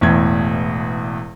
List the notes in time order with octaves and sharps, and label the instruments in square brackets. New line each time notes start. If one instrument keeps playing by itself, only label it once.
[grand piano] E1 E2 A2 E3 G#6